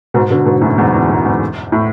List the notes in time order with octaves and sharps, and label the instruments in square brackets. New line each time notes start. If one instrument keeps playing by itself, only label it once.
[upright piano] G#2 B2
B2 D3
G#2 B2
F#2 A2
E2 G#2
E2
F#2
E2 G#2
A2